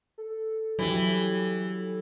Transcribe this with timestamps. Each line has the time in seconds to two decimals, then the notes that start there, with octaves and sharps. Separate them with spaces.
0.18 A4
0.79 E3 F#3 G4